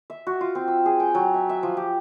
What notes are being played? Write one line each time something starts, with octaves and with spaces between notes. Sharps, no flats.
E5
F#4
F4
C4
E6
G#4
G5
F#3
E5
E5
F3
G4